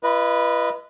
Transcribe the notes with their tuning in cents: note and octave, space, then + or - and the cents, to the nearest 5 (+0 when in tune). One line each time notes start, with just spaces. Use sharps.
E4 +45 B4 -10 D#5 -15